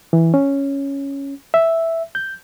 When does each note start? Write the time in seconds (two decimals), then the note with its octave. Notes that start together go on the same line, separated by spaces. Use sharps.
0.13 E3
0.34 C#4
1.54 E5
2.15 G6